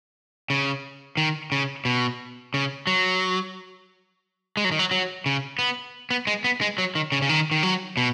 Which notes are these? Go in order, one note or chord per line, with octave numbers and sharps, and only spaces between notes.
C#3
D#3
C#3
B2
C#3
F#3
G#3
F#3
D#3
F#3
F#3
C#3
B3
B3
G#3
B3
G#3
F#3
D#3
C#3
C#3
D#3
D#3
F#3
B2